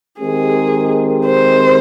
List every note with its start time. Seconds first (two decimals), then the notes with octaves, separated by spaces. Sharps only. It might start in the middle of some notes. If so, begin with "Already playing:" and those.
0.20 D#3 G#3 C4 G4 G#4 A#4
1.26 C5